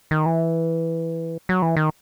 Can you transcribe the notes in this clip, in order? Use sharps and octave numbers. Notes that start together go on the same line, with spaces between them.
D#3
E3
F#3
E3
D#3